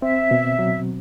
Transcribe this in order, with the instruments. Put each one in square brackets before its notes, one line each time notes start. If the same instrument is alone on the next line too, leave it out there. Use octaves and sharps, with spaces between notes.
[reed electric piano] C4 [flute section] E5
[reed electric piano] B2
F#3